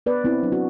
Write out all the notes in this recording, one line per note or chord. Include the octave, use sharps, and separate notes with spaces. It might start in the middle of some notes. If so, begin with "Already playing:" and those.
B3 B4 D5
B3 C4 E4
F#3 D4
F#4